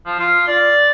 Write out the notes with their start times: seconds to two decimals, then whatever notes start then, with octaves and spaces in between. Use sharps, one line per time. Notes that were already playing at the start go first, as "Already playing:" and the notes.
0.06 F3
0.19 F4
0.47 D5